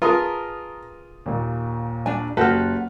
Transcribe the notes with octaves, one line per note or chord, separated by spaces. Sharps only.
F4 G#4 A#4 B4 A5 A#5 D#6
D#2 A#2
D4 F5 G#5
F#1 F#4 G4 A4 B4 F6